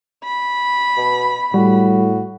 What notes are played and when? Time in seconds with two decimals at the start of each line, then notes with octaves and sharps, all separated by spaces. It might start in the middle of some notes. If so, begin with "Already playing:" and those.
0.24 B5
0.97 B2
1.54 A2 G3 F#4